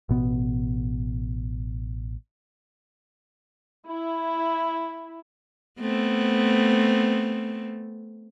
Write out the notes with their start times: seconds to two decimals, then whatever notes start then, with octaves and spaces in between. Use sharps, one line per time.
0.09 A1 B2 B3
3.84 E4
5.80 A3 B3 C4